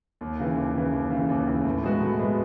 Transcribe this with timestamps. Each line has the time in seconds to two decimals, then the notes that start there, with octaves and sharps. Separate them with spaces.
0.21 D#2
0.40 C#3 E3
0.57 D#2
0.75 C#3 E3
0.93 D#2
1.11 C#3 E3
1.29 D#2
1.47 C#3 E3
1.65 A2
1.83 G#3 B3 F#4
2.01 A2
2.19 G#3 B3 F#4